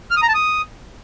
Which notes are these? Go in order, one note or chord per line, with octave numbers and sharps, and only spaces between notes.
F6
D#6
A#5
A5
D#6